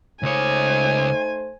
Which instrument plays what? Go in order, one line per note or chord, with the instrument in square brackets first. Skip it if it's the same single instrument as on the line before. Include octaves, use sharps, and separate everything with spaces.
[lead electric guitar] C#2 C#5 [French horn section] A3 D#4 C5 [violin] G#5